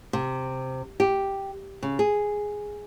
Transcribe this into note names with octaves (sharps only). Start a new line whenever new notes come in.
C3
G4
C#3
G#4